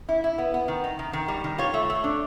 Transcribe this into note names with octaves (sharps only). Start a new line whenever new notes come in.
E4
E4
B3
B3
D#3
D#4
D#3
D#3
G3
D#3
F4 C#5
A3
A3
D4